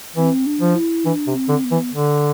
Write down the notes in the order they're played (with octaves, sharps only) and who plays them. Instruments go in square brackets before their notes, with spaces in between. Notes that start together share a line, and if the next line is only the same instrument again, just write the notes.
[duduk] E3 [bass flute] C4
[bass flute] D4
[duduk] F3
[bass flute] E4
[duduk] E3 [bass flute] D4
[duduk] C3
[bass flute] C4
[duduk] D3
[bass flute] B3
[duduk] E3
D3